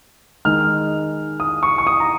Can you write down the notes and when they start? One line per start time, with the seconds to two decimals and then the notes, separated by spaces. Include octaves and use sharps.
0.45 D#3 G#3 D#4 F6
1.40 D#6
1.63 C#6
1.78 C#6
1.87 D#6
2.00 A#5